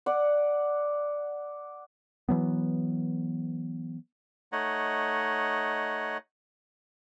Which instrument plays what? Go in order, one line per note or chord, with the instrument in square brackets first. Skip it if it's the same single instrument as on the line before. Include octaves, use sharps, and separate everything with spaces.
[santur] D5 F#5
[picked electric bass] E3 F#3 B3
[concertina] A3 D#4 C#5 D#5 F#5